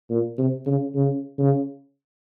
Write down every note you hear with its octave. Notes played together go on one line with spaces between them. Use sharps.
A#2
C3
C#3
C#3
C#3